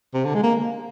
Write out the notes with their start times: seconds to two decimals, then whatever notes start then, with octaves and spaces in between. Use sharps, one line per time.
0.14 C3
0.25 D3
0.34 G#3
0.43 A#3